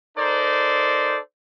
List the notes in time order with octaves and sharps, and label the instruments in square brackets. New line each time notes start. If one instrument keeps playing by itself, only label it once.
[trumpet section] D#4 A4 A#4 C5 D5